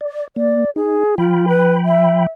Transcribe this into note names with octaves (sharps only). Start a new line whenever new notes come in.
D5
A#3 D5
D#4 G#4
F3 F4 G5 B5
B4
E5